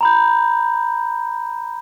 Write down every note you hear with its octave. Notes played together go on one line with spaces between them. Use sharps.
A#5 B5 G6